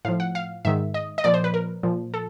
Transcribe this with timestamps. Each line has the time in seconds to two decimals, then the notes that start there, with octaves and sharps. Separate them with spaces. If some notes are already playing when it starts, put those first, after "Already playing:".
0.05 A2 F5
0.08 F3
0.20 F#5
0.35 F5
0.65 G#2 D#3 E5
0.94 D#5
1.18 D#5
1.24 A#2 F3 D5
1.34 C5
1.44 B4
1.54 A#4
1.83 A#2 F3
2.14 A4